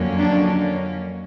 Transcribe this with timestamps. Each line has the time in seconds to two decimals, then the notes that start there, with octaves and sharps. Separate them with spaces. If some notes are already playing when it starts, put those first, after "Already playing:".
Already playing: F2 D3 F#3 A#3 C#4
0.19 D4